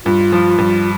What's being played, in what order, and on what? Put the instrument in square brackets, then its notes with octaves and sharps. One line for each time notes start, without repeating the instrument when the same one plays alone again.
[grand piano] G2 [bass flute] F4
[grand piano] F3
G2